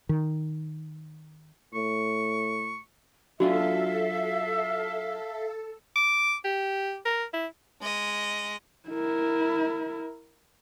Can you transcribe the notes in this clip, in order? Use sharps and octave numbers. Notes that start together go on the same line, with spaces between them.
D#3
A2 C#6
F#3 D4 F4 F#4 A4 E5 F5
D6
G4
A#4
E4
G#3 D#5
E4 A#4